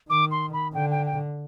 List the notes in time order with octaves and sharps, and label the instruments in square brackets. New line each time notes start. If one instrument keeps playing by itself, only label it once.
[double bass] D#3 [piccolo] D6
[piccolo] C6
B5
[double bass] D3 [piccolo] G5
[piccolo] G5
G5